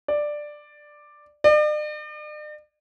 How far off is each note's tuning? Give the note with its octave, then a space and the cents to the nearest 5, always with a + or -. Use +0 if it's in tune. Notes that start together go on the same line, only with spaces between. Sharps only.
D5 +10
D5 +45